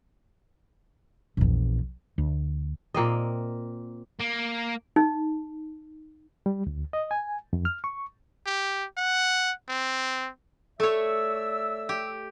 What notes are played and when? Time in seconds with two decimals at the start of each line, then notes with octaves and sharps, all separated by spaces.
1.37 A#1 E2
2.18 D2
2.94 A#2 A#3 C4 D#5
4.19 A#3
4.96 D#4
6.46 G3
6.67 D2
6.93 D#5
7.11 G#5
7.53 F2
7.65 F6
7.84 C#6
8.46 G4
8.97 F#5
9.68 C4
10.80 A3 C#5 D5 E5 E6
11.89 G4